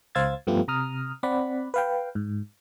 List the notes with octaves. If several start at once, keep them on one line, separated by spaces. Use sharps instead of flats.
C#2 C5 F5 E6 G#6 A6
G2 F3 A3 B3 F4 G4
C3 A#5 D#6 F6
C4 D5 F#5 B5
B4 F5 G5
G#2